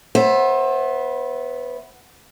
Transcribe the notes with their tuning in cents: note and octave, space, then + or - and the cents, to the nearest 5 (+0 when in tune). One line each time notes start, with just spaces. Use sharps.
B3 +0 C5 +35 E5 +0